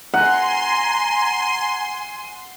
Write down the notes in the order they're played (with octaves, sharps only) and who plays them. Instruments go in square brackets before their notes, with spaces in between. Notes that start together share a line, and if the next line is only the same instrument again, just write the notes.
[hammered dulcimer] F#5 [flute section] G#5 [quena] A#5 [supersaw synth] C6